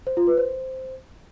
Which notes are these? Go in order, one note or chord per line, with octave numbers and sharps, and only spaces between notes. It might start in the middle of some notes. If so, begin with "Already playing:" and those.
C5
F4
B4
C5